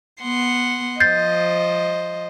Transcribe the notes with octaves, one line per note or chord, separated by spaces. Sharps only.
B3 F#5 C6
F3 C5 D#5 G6 A6 C7